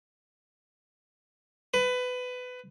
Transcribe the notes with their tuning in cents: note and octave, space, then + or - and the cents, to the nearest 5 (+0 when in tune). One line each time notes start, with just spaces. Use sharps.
B4 +20